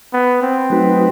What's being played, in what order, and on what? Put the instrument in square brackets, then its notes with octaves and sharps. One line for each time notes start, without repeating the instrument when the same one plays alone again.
[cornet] B3
C4
[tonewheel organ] F#3 A3 D#4 F#4 B4